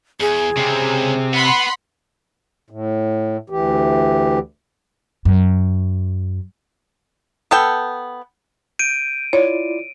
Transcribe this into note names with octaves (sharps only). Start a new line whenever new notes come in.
E2 G#4
C#2 C3 C4
B3 F#5 B5 C6
A2
D2 E3 G4
F#2
B3 A4 G5
G6 D7 D#7
E4 F4 C#5 D5